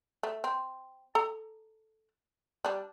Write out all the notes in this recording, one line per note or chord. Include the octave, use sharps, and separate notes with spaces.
A3
C4
A4 A#5
G3 D4